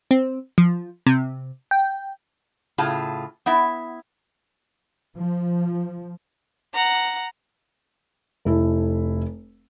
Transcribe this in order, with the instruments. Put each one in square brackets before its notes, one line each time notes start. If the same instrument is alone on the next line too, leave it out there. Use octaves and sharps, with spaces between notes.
[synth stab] C4
F3
C3
G5
[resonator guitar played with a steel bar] A2 C#3 F4 G#4 A5
B3 E4 E5
[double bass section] F3
[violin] F#5 A#5
[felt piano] F1 E4 A4